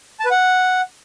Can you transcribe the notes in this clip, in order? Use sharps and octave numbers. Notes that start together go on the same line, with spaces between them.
A5
B4
F#5